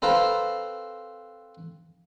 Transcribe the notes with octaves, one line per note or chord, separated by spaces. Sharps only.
C4 A4 B4 C5 F5 A#5